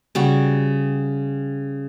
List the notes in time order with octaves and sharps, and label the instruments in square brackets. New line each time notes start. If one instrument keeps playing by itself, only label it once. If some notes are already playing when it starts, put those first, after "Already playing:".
[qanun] C#3 G3 F#4